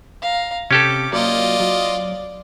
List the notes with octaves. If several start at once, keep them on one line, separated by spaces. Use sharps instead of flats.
F5 A#5
C3 C#4 G4 A4 D6
F#3 A#3 F4 D5 D#5
F#3